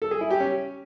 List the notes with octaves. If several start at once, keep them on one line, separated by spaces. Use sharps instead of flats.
A4
G#4
E4
G4
C#4